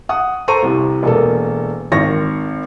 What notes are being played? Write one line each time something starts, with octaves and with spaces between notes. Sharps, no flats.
F#5 D#6
A4 C5 A#5 C#6 D#7
C2 C3
E1 A#3 A4
G#1 D#3 C#6 A#6